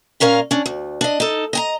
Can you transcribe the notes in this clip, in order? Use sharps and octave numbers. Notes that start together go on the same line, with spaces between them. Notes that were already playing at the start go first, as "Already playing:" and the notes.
A#2 C#4 A#4 F5
C#4 D4
D2
D4 D#5
D#4 A4
D#5 G#5 A#5